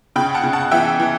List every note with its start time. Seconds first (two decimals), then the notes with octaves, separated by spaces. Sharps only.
0.16 C#3 G5 B5
0.34 F#5 A5
0.43 C#3
0.53 F#5 A5
0.71 E3 E5 G5
1.00 E3